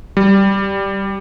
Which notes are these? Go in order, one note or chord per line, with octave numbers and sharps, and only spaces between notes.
G3